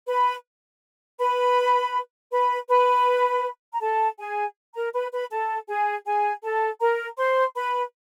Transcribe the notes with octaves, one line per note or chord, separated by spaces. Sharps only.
B4 B5
B4 B5
B4 B5
B4 B5
A#5
A4 A5
G#4 G#5
A#4 A#5
B4 B5
B4 B5
A4 A5
G#4 G#5
G#4 G#5
A4 A5
A#4 A#5
C5 C6
B4 B5